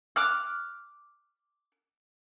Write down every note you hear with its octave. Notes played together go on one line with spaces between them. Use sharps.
D6 F6 F#6